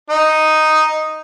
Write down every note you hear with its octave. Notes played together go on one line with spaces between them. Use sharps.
D#4